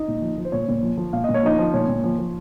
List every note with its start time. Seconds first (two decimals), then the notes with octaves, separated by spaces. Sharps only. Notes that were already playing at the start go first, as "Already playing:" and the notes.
Already playing: D#4 D#5
0.08 A#2
0.22 F3
0.38 F3
0.45 C5
0.52 A#2 C#5
0.68 A#2
0.83 F3
0.97 F3
1.13 A#2 F5
1.24 A#2 D#5
1.34 C#5
1.43 F3 D#4 D#5
1.59 F3
1.74 A#2 C#5
1.88 A#2
2.04 F3
2.18 F3